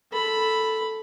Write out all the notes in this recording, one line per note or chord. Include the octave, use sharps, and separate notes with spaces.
A4 B5